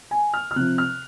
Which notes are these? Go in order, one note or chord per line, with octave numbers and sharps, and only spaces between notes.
G#5
F6
F6
C3 F3 F#6
F6